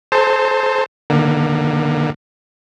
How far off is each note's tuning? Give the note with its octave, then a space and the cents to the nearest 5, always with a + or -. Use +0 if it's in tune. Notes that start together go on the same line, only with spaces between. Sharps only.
A4 -40 C5 +0 A5 +40
D3 +35 A#3 +20